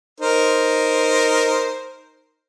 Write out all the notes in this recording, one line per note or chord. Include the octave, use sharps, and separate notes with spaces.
D#4 A#4 C5